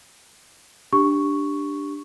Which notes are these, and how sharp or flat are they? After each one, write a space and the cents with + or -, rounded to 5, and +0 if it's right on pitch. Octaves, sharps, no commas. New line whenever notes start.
D4 +0 G4 +0 C#6 +0